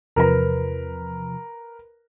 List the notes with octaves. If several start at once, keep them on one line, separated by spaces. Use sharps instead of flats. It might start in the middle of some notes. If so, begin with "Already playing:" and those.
E2 C3 F3 A#4 B4 A#5